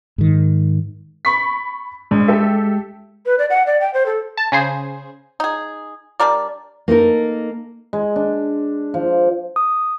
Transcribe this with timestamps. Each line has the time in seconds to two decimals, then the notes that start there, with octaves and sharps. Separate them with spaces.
0.18 G#2 D#3
1.25 B5 C#6 B6
2.11 A#1 G#3
2.28 G4 A4 E5
3.26 B4
3.39 D5
3.50 F#5
3.67 D5
3.80 G5
3.94 C5
4.06 A4
4.37 A5
4.52 C#3 G#4 C5
5.40 D#4 G#4
6.20 G3 D4 A#4 D5
6.88 A#3 D#4 A4 A#4
7.93 G#3
8.16 D4
8.94 F3
9.56 D#6